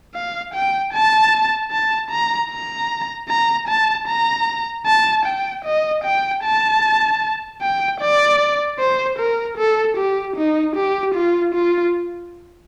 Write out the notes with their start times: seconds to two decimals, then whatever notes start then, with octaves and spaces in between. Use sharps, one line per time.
0.14 F5
0.54 G5
0.93 A5
1.71 A5
2.11 A#5
2.51 A#5
3.29 A#5
3.68 A5
4.07 A#5
4.86 A5
5.25 G5
5.65 D#5
6.04 G5
6.43 A5
7.61 G5
8.01 D5
8.79 C5
9.19 A#4
9.58 A4
9.97 G4
10.36 D#4
10.76 G4
11.15 F4
11.54 F4